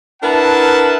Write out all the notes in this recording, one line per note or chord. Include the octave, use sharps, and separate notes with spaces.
D4 E4 A#4 B4 F#5 A5